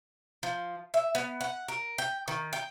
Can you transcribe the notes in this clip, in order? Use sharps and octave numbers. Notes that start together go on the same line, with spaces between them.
F3
E5
B3
F#5
A#4
G5
D#3
G5